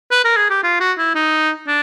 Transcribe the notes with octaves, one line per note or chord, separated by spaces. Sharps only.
B4
A#4
G#4
G4
F4
F#4
E4
D#4
D4